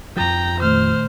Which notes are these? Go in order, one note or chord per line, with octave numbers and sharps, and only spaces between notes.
F2 F3 G5 A#5
A#2 D#3 A3 C5 F6